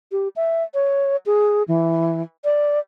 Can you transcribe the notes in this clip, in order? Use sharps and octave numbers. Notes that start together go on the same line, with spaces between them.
G4
E5
C#5
G#4
E3
D5